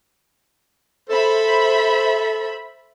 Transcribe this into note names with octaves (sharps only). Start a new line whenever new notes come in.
A4 C5 E5 B5